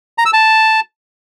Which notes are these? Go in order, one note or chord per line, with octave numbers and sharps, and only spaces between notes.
A#5
E6
A5